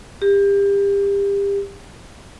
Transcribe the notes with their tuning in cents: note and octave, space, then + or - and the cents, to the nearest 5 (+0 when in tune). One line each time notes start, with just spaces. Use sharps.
G4 +30